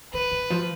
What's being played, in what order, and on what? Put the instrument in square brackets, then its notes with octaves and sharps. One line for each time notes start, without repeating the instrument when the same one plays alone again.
[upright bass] D3 [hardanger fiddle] B4
[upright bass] D3
F3